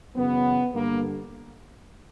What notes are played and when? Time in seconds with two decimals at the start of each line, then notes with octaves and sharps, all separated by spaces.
0.16 F#2 C#3 E3 B3
0.74 G2 D3 A#3